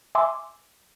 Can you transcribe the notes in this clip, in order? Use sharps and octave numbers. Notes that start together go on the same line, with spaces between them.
E5 G#5 C6 D6 E6